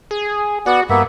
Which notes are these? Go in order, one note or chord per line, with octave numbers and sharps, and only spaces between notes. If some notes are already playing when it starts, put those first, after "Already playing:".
G#4
B3 F#4 D5 F#5
G2 A#3 B3 E5